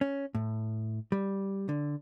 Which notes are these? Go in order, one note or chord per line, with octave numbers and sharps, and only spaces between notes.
C#4
A2
G3
D3